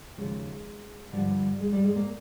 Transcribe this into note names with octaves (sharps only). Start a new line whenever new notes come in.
D#2 C#3 F3 G#3
G2 D3 F3 G3
G#3
G3
G#3
A#3